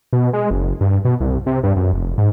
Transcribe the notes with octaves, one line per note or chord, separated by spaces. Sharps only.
B2
G#3
F#1
G2
B2
C2
C3
G2
F#2
F1
G#2